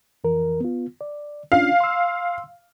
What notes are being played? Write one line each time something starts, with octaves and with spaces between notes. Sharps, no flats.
F2 E3 A#4
B3 F4
D5
C#4 D4 F4 F5
C6 E6